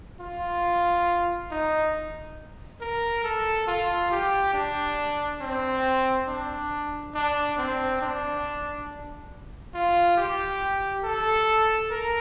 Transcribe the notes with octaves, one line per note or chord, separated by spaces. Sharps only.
F4
D#4
A#4
A4
F4
G4
D4
C4
D4
D4
C4
D4
F4
G4
A4
A#4